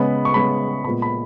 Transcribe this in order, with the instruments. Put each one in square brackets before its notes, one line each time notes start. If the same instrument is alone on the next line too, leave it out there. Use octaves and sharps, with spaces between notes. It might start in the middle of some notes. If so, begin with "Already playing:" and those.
Already playing: [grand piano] C#3 G#3 B3 B5
C#6
C#3 G#3 B3 B5
A#2 G#3 B3 B5
B5